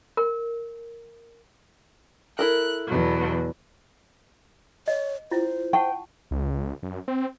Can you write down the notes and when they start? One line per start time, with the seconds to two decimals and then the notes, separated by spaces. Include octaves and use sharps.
0.17 A#4
2.39 E4 A4 A#4 F#6
2.87 E2 B2 F#3
4.88 C#5 D#5
5.31 C#4 E4 F4 C5
5.73 F#5 G5 A5 C#6
6.31 C#2
6.83 F#2
7.08 C4